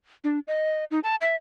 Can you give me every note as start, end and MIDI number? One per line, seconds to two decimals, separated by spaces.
0.24 0.39 62
0.48 0.84 75
0.91 1.00 63
1.04 1.15 81
1.21 1.35 76